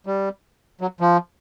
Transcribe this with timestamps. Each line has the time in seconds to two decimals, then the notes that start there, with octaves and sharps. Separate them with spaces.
0.06 G3
0.81 F#3
1.00 F3